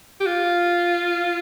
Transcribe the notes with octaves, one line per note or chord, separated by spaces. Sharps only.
G4
F4